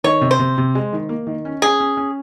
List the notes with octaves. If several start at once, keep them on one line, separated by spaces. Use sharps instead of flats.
D#3 C#5
C3
C5
C3
C3
G#3
D#3
A#3
D#3
C#4
C#4 G#4
C#4
C#4